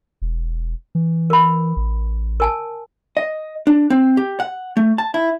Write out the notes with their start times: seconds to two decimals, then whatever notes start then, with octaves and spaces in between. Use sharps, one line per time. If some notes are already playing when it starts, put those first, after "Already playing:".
0.22 E1
0.95 E3
1.30 A#4 B5
1.77 A1
2.40 A#4 G#5 A5
3.17 D#5
3.67 D4
3.90 C4
4.17 G4
4.40 F#5
4.77 A3
4.98 A5
5.14 E4